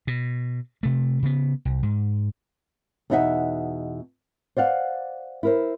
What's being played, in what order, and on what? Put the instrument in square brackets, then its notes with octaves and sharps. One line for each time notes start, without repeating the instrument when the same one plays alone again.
[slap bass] B2
C3 A3
C#3 B3
C2
G#2
[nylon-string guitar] E2 B2 D#4 D#5 E5 F#5
C5 D5 F5 F#5
E4 A#4 C5